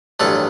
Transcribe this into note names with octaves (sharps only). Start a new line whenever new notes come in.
A1 G2 D#3 F#3 A3 A4